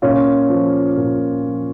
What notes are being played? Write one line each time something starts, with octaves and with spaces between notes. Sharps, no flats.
A#2 C#4 F4
F3
A#2
F3